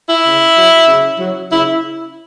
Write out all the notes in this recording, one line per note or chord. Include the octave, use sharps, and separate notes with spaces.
E4
C#3
F#3
C#3
F#3
C#3 E4